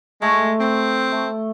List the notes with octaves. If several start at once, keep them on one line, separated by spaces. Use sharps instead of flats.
G#3 A3
C4
A3